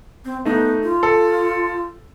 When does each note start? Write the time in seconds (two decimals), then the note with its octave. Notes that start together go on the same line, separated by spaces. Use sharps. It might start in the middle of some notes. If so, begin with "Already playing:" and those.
0.25 C4
0.45 A3 B3 D#4
0.83 F4
1.03 A4